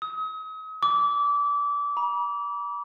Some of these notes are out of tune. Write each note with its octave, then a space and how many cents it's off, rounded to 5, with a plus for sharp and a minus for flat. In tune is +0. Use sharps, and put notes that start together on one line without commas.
D#6 +40
D6 -25
B5 -45